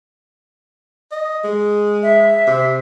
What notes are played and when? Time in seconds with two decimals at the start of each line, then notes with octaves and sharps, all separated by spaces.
1.12 D#5
1.44 G#3
2.03 E5
2.47 C3